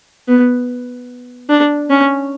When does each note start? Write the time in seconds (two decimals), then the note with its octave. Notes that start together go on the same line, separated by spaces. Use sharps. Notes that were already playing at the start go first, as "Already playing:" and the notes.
0.28 B3
1.50 D4
1.90 C#4